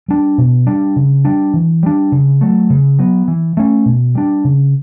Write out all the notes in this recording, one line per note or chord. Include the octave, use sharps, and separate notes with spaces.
G3 D4
B2
G3 D4
C#3
G3 D4
E3
G3 D4
C#3
F#3 A3
C#3
F#3 B3
E3
A3 C#4
B2
G3 D4
C#3